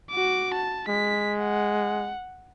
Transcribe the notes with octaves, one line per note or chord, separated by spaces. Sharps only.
F#4 D6
A5
G#3 B6
F#5